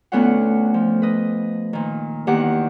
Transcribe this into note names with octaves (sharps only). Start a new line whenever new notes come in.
D2 A3 B3 C#4 F4 F#5
F3
B4 D#5
A#2 D#3
E2 D#3 A#3 G4 F#5